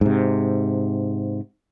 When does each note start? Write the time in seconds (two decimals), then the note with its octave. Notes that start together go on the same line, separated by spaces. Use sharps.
0.01 G#2 C3